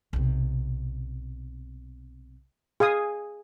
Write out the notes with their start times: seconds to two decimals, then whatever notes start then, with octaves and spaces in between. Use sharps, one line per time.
0.13 B1 C3
2.80 G#4 F5 G#5 D#6